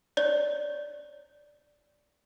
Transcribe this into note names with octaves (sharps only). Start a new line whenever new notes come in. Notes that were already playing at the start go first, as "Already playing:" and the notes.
C#5 D5